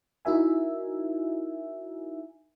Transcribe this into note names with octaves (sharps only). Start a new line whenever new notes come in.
D#4 E4 F#4 A#4 E5 G#5